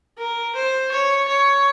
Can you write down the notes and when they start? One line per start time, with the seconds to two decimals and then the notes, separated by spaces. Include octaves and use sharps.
0.18 A#4
0.55 C5
0.91 C#5
1.28 C#5